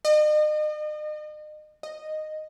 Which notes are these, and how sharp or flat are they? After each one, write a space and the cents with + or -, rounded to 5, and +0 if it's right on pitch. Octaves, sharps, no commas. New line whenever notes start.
D#5 -40
D#5 -10